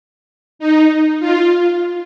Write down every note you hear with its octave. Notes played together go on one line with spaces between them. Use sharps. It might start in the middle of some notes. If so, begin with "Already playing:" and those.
D#4
F4